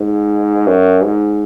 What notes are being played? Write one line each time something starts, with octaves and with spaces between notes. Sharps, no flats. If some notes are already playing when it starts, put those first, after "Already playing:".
Already playing: G#2
F#2
G#2